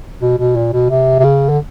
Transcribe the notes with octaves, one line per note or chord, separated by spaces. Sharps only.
B2
B2
A#2
B2
C3
C3
C#3
D3